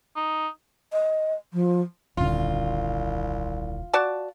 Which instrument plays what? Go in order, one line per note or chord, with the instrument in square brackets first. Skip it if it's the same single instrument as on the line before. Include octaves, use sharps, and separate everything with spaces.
[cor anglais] D#4
[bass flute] D#5
F3
[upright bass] D#1 D3 [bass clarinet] C2 [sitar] F4
[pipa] F#4 D5 A5